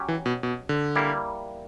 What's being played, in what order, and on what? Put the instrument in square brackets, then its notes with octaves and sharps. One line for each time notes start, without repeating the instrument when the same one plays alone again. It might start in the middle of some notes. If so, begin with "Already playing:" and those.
Already playing: [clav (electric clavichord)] F#3 C#4 G4
[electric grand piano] E3
B2
B2
D3
[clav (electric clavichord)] G3 A#3 E4